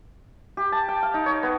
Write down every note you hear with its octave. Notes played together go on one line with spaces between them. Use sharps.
G4
A5
G5
F5
D#4
C#5
B3